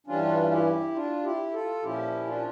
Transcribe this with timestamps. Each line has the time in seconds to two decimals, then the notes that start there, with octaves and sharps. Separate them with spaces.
0.07 G2 E3 G3 C#4 D4 F4
0.51 E4 G4
0.95 D4 F4
1.24 E4 G4
1.54 F4 A4
1.82 A#2 F3 C#4 E4 G4
2.27 D4 F4